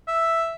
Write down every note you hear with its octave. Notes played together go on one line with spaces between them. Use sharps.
E5